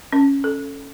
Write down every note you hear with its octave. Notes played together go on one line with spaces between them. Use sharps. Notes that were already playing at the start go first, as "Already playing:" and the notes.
C#4
A4